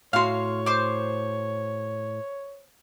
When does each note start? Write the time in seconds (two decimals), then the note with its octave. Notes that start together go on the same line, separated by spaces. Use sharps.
0.13 A2 F#4 C#5 F5 C6
0.66 C5 D6